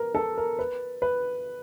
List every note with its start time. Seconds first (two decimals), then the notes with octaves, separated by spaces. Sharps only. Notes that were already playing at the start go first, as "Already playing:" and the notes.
Already playing: A#4 B4
0.15 A4
0.38 A#4
0.59 B4
1.02 B4